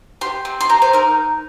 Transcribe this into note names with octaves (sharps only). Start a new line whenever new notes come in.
G4 C6
C4
C6
G4 A#5
C5
D#4 A#4